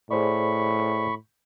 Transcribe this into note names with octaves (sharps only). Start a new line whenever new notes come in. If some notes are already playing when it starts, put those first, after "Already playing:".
A2 G#4 C5 D5 B5 C#6